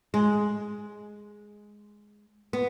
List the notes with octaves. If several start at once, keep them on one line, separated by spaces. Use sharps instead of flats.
G#3
B3